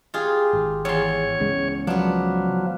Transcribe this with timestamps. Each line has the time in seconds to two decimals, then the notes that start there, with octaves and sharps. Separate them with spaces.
0.14 F4 G4 G#4
0.53 G#1
0.85 E2 C#5 C6
1.39 C#2 C#3 G#3
1.87 F3 F#3 B3 D4